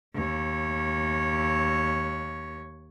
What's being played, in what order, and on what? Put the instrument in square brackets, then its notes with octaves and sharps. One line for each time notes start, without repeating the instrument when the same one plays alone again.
[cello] D#2 C#5